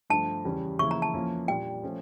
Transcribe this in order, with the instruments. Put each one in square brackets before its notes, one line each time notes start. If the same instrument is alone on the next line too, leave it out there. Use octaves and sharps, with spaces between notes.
[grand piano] G2 F3 A3 [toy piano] A5
[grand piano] E2 C#3 G3 C#4
[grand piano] F2 C#3 E3 A#3 E4 [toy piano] C#6
[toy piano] A#5
A5
[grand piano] F2 E3 A#3 C#4 F4
[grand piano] A#2 G3 D4 [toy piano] G5
[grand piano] F3 A3 C#4